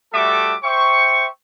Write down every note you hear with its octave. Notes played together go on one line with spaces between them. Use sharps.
G3 A3 F#4 A4 E5 D6
C5 E5 G5 C#6